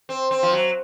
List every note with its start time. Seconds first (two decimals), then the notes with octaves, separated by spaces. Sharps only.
0.09 C4
0.31 C4
0.43 F3
0.53 F#3